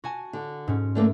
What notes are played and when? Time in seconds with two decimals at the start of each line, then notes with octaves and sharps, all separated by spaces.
0.04 F#4 G#5 A5
0.33 D3
0.67 G#2 C#4
0.95 D3 A3 A#3